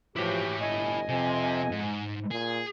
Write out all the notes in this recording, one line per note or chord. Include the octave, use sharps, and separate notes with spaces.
E3 F3 E4 F#4 G4 C#5
G1 D#5 G#5
F2 C3
G#2
A#2 G#4